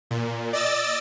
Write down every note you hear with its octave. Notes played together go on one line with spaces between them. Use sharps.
A#2
D5 D#5 E6 A6